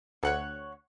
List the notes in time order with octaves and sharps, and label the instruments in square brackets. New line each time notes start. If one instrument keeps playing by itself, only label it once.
[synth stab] D2 [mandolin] C#5 F#5 C#6